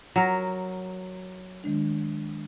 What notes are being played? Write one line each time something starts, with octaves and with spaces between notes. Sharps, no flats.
F#3 A#4 F#5 A#6
D#3 G#3 D4